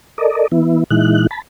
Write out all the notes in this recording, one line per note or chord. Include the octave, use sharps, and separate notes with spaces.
A4 A#4 D5 D#5
E3 B3 E4
A#2 E3 G#3 D#4 E4 F#6
A5 B5